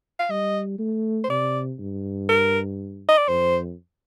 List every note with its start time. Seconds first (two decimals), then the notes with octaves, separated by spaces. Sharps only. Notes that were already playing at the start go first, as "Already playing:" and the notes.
0.19 F5
0.29 G3 D#5
0.79 A3
1.24 C5
1.30 C3 D5
1.79 G2
2.29 A#4
3.08 D#5
3.18 D5
3.28 F2 C5